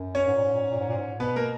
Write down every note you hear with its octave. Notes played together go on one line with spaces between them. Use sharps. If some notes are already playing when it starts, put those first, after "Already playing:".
Already playing: F#2
C#4 C#5
G#2
A#2
G#2
A#2
G#2
A#2
G#2
A#2
G#2
B2 B3 B4
A#3 A#4